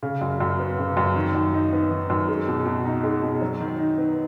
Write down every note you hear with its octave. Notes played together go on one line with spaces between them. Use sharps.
C#3
F#2
F#2
B3
C#3
F#2
D#3
F#2
D#4
B3
D#3
F#2
G#3
B2
B2
D#4
G#3
B2
F#3
D#3
D#4
B3